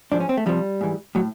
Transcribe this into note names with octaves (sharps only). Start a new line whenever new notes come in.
G#2 F3 D4
C#4
C4
A3
F2 C3 F3 G3
G#2 E3
A2 F#3